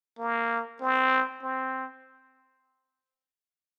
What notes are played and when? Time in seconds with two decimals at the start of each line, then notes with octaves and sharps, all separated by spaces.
0.19 A#3
0.81 C4
1.43 C4